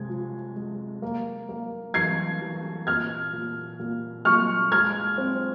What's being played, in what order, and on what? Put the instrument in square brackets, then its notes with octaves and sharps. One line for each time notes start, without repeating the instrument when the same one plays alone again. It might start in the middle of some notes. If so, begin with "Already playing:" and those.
Already playing: [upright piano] C3 G#3 G#6
F3
G#3
A#3
A#3
E3 G#6 C7
E3
A#2 F6 G#6
A#2
A#2
A#2 C#6 F6
G#3 F6 G#6
C4